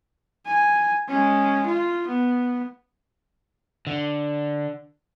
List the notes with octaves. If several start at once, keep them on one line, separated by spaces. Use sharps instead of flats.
G#5
G#3 C#4
F4
B3
D3